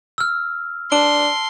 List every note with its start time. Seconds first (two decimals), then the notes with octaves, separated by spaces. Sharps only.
0.18 E6 F6
0.92 D4 A5 C6 D7 G7